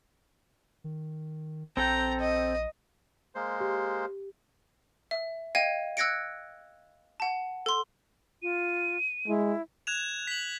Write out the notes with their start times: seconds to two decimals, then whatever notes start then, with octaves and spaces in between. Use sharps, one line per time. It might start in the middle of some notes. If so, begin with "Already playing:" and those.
0.84 D#3
1.77 A#1 C4 A4 G5 A#5
2.20 D#5
3.35 G#3 A#3 C5
3.60 G4
5.11 E5
5.55 D#5 F5 G5 G#6 D#7
5.97 E6 F#6 G#6 A#6 C#7 D7
7.20 F#5 A5
7.66 A4 C6
8.42 F4 D#7
9.28 G#3 E4
9.87 F#6 G#6 E7 F7
10.27 B6 F#7